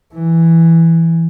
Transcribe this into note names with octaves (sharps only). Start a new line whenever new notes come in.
E3